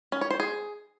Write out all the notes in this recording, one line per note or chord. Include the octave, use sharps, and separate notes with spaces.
C#4
C#5
C5
G#4